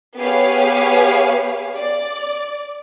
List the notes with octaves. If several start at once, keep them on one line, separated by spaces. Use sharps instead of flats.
B3 G4 G#4 B4 C#5 F5
D5